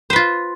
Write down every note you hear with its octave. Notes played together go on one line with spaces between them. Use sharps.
F4 B4 C5